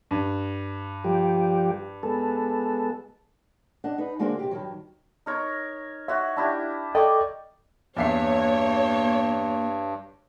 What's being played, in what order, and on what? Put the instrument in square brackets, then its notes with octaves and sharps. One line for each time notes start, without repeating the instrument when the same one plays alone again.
[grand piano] G2
[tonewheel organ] F3 G3 G4
G#3 B3 A4
[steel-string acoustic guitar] D4 D#5 F#5
D#4 B4
D3 G#3 A#3 D4 F#4 C5
C3 G4
G2 D#3 F#3
[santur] D#4 A#4 C#5
[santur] F#4 C#5 [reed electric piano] E5
[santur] D4 E4 G4
[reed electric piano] A4 D#5 G5 [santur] D5 C#6 D6
[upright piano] E2 E5 C7 [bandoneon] G2 [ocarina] A#3 [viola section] C#5